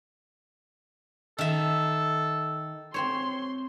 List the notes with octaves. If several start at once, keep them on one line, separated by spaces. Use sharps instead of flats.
D#3 A4 E5
C4 C5 C#5 C6